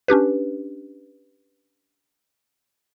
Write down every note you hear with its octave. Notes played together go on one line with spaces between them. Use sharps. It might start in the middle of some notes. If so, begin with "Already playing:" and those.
C#4 D4 G4 B4